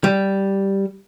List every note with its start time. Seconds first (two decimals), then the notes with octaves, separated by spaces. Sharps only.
0.04 G3